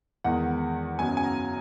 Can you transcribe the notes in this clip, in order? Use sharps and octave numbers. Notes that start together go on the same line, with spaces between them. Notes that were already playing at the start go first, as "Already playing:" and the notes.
E2 D#3 G#3 F#5
F#2 C#3 F#3 B3 G#5
G#5
A#5